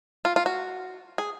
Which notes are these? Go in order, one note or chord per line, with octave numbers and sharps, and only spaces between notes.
F4
F4
F#4
G#4